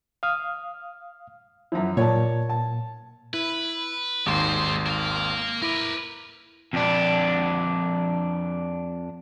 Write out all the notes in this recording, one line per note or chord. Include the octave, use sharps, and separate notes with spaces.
F5 D#6 F6
F#2 E3 F3 E4
A#2 C#5 D5 A5
A5
E4 B4
G#1 D#2 G#3 C5 C6
A#3 F5
E4 A#4 B4 D6
F2 D4